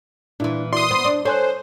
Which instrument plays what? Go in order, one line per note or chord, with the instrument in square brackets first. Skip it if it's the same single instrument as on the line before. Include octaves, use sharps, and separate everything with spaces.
[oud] A#2 E3 [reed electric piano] D4 E4
[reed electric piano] E4 F#4 D5 [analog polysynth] C6 D#6
[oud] B3 [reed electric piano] C5
[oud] D4
[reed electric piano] A4 G#5 F#6 [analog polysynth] C5 [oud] C#5